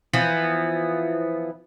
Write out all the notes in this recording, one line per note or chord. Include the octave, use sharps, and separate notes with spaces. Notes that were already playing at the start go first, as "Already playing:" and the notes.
E3 F3 B3